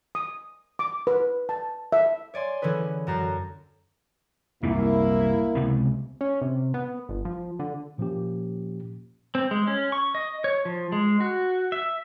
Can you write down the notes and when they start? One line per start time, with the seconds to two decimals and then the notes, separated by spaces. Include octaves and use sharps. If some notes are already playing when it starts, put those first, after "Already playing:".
0.15 D#6
0.79 D6
1.07 B4
1.49 A5
1.92 E5
2.34 C#5 D5 G#5 C6
2.62 D3 E3 C#4 G#4 B4
3.07 F#2 F#4 A5 A#5 G6 C7
4.63 C2 F#2 A#2 A#3 E4
5.55 C#2 C3 B3
6.21 C#4
6.42 C3
6.74 B3
7.09 G1
7.25 F3
7.59 D3
7.98 A#2 F3 A#3 C#4 G4
9.35 C4
9.51 G#3
9.67 C#4
9.92 C#6
10.15 D#5
10.44 C#5
10.65 F3
10.92 G#3
11.20 F#4
11.72 E5